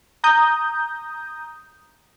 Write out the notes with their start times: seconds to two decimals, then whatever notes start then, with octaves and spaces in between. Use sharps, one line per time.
0.24 A#5 D#6 G6